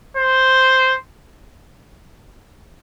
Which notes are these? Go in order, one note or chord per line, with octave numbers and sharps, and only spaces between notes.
C5